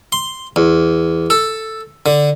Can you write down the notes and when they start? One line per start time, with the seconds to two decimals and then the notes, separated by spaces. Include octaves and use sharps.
0.12 C6
0.56 E2
1.30 A4
2.06 D3